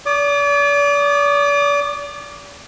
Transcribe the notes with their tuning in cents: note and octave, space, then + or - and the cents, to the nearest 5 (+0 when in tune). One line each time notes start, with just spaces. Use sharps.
D5 -40 D6 +40